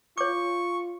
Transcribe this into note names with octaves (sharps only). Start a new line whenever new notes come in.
F4 C#5 C#6 D6